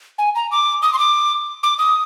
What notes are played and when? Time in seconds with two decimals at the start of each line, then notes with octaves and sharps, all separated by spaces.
0.18 G#5
0.35 A#5
0.51 D6
0.82 D#6
0.93 C6
0.99 D6
1.63 D6
1.78 D#6